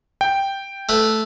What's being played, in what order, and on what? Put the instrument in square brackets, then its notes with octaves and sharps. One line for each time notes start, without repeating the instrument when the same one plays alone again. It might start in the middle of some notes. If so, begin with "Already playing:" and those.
[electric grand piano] G5
[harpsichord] A3 B4